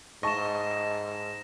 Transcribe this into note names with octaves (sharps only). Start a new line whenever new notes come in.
G#2 D#5 A5 C#6 A#6 E7